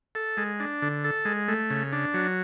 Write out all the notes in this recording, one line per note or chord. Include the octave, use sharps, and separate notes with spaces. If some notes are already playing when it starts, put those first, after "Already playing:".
A4
G#3
D4
D3
A4
G#3
A3
C#3
D4
F#3